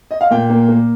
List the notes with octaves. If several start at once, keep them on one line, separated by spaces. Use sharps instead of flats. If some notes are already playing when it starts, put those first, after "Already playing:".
D#5
F5
A#2 G5
A#3
A#3